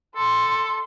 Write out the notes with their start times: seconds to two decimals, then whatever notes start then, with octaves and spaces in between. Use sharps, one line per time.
0.15 A4 C6